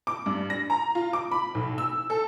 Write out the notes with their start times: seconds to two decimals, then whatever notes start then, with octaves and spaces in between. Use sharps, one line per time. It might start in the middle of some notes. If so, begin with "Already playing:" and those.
0.07 D6
0.26 G2
0.50 A#6
0.70 A#5
0.95 F4
1.13 D6
1.31 B5
1.55 B1
1.78 E6
2.10 A4